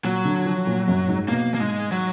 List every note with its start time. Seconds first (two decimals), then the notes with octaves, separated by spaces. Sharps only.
0.04 A#2 F#3
0.25 D3
0.46 F3
0.67 A#2
0.88 F#2
1.08 G#2
1.28 B2 A#3
1.54 A#3
1.60 G#2 G#3
1.91 F#3